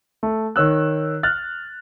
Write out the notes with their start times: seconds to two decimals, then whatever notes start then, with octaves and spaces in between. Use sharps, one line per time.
0.23 A3
0.56 D#3 C#5 E6 F#6
1.23 F6 F#6 A6